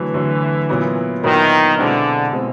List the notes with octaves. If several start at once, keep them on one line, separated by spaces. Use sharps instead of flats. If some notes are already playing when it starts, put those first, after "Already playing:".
Already playing: D3 E3 F#3 A3
D3 F#3 A3
A#2 F#3 B3 E4
A#2 D#3 F#3 B3 E4
B2 D3 G#3 C4 E4
B2 G#3 C4 E4